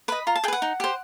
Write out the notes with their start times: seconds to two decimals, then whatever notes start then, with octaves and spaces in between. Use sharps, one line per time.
0.08 B4 D#5 B5
0.27 F4 A#5
0.35 A5
0.44 G#4 G5
0.48 B4 F#5
0.62 D#4
0.80 G4 C5